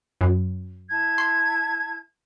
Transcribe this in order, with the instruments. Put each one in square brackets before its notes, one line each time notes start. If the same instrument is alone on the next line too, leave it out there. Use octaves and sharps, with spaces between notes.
[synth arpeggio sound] F#2
[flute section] E4 A5 G#6
[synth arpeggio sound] C6